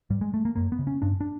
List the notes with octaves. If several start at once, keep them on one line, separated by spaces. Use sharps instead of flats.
G#2 G3
G#3
A3
A#3
F#2 A#3
B3
C#3
C#4
G2 D4
D4